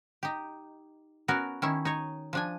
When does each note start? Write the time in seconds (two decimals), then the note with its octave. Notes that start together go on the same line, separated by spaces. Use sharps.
0.23 D#4 G4
1.28 B3 C#4 F#4 A#4
1.62 D#3 C#4 E4
1.85 D#4 C#5
2.33 F3 D4 G#5